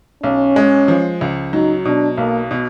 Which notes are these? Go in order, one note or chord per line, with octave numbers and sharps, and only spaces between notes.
B1 C#4
G#3
F3
C#2
F#3 D#4
B2 D4
B1 A#3
B2